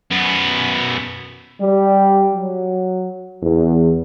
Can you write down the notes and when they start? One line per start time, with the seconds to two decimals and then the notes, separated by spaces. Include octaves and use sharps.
0.11 F#2 B3
1.61 G3
2.35 F#3
3.43 E2